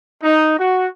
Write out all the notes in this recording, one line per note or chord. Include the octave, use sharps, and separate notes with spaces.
D#4
F#4